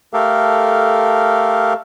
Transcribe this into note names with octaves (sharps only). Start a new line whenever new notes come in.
A3 G4 A4 A#4 F5